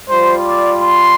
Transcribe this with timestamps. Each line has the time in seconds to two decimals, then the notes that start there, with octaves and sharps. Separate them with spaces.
0.08 G3 F4 C5
0.45 D5
0.82 C6